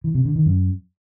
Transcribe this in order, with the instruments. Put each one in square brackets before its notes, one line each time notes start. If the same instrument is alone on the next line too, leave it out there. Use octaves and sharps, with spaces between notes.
[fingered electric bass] E3
C3
D3
D#3
F#2